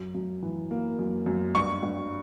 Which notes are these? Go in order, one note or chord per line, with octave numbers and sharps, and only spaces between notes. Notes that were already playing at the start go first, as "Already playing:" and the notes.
Already playing: F#2
F#2
E3
A#3
F#2
F#2
G2 C#6
G2